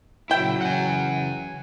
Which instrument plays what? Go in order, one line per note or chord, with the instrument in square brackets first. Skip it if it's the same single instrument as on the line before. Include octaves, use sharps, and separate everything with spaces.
[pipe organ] A#2 C#3 [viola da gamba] F#3 F#4 [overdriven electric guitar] E4 [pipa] G5
[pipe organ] C#3 E3 [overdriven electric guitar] F#5 G#5